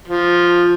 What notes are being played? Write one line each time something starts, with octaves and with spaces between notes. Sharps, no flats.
F3